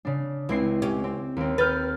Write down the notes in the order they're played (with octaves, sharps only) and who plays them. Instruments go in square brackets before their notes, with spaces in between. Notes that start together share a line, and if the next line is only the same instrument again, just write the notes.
[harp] C#3 D4
[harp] C#2 C4 C7 [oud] E4
[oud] C#4 G4
[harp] C4
D#2 C4
[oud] B4 [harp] F6 G6 A6